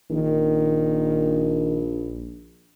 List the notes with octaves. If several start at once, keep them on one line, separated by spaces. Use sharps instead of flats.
A#1 D#3